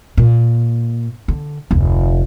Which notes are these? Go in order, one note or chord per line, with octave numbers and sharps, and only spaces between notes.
A#2
D3
F1 D2